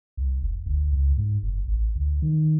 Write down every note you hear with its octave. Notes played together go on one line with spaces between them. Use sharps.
C2
F1
D2
C#2
G#2
F#1
A1
D2
D#3